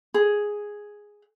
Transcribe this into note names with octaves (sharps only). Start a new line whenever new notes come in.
G#4